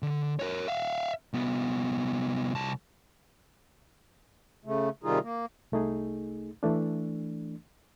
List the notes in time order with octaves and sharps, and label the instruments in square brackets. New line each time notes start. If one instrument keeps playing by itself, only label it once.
[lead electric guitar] D3
A#4 C#5
E5 F5
C2 B3
C2 A5
[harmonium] C#3 A3
C3 D#3 G3 D#4 F4 G#4
A#3
[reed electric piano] C2 A3 D#4 G#4
E3 A3 D4